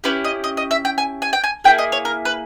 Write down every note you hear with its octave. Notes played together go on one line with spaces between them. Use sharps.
C#4 E4 G4 B4
D#5
D#5
D#5
E5
G5
G#5
G#5
G5
G#5
A#3 E4 G#4 G5
D#5
C#5
A#4
B4